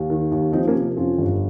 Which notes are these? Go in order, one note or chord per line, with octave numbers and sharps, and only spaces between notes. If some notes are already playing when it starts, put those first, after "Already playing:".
Already playing: D#2
D#3
D#2
F3 C4 D#4
A#3 C#4
C3
F2 C#4 F4
G1